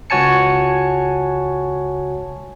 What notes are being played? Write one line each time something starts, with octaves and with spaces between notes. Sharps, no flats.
C#2 F#4 C#5 G#5 A5 C#7